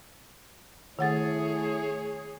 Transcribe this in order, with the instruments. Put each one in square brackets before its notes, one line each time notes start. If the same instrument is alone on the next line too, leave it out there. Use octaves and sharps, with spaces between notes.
[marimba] D#3 F#5 A6 [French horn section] A3 E4 [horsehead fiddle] G#4 C#5